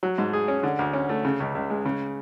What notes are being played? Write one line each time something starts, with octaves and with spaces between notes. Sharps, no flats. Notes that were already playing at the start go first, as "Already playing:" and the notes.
F#3
G#2
G#4
C#4
D3
D2
C#4
A3
C#3
C#2
C#2
G#3
C#3